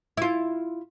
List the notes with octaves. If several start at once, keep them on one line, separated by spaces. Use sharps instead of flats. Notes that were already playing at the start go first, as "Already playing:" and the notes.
E4 F4